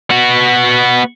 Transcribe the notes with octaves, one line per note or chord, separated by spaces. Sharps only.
B3 F#4